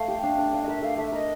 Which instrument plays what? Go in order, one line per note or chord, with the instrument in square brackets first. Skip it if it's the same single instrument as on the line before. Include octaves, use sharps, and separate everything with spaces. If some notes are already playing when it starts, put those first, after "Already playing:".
Already playing: [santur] A3 [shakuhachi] F5
[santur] G4
D4
D4
[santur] D4 [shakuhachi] F5
[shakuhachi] D#5
[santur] A#4 [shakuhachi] E5
[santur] A3 [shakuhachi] F5
[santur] A3 [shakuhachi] E5
[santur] A#4 [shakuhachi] D#5